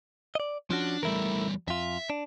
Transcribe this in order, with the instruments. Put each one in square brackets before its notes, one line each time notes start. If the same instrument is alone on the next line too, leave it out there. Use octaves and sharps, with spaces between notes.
[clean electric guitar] D5 D#5
[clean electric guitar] F3 C#4 F#4 [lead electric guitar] D4
[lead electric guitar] E2 G3 [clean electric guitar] A3 E4 A#4
[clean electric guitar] F2 F4 [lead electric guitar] E5
[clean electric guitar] D4